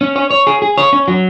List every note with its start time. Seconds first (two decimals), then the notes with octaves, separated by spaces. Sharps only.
0.01 C#4
0.16 C#5
0.31 C#5
0.47 G#4
0.62 G#4
0.78 C#5
0.93 C#4
1.08 F#3